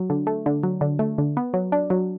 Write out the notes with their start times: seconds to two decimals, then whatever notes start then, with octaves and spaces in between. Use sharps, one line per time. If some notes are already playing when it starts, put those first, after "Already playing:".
Already playing: F#3
0.10 D3
0.27 A3
0.46 D3
0.63 F#3
0.81 D3
0.99 A3
1.18 D3
1.37 B3
1.54 F#3
1.72 D4
1.90 F#3